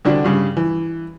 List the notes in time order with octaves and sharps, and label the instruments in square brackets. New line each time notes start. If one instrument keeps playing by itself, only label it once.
[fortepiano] C2 D3 D4 F#4
G2 C#3 G3
E3